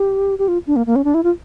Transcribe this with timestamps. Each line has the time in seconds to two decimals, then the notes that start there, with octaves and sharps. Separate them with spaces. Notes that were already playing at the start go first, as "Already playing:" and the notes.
Already playing: G4
0.39 G4
0.48 F4
0.67 D4
0.76 A#3
0.87 A#3
0.96 C#4
1.04 D4
1.14 E4
1.23 F4